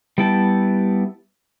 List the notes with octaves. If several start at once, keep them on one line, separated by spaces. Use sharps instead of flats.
G3 B3 E4 G5 A5